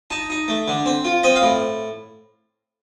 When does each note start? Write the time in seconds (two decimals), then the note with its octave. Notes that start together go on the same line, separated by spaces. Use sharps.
0.10 D#4 A5
0.30 D#4
0.48 A3
0.68 D3
0.86 C4
1.05 F4
1.23 C4 D#5
1.36 F5
1.42 A2